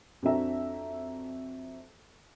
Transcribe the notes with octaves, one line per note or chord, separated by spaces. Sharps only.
F2 C4 D4 F#4 E5 A#5